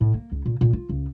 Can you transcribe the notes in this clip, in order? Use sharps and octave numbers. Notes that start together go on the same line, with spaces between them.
A2
A#3
C#2
A#2
A#2
F4
C#2